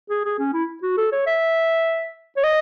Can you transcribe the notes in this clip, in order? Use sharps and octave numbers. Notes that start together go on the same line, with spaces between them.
G#4
G#4
C#4
E4
F#4
A4
C#5
E5
C#5
D#5